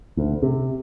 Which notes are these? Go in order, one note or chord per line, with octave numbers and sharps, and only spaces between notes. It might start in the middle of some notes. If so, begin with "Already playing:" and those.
D2
C3